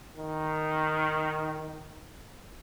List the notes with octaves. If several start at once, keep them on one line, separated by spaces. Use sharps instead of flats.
D#3